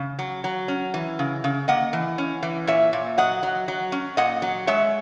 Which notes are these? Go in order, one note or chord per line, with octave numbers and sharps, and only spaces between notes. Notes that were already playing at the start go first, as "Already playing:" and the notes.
Already playing: C#3
F#3
F#3
C#4
E3
C#3
C#3
A#3 D#5 F#5
E3
C#4
E3
A#2 C#5 E5
A#2
F#3 D#5 F#5
F#3
F#3
C#4
A#2 D#5 F#5
F#3
G#3 C#5 E5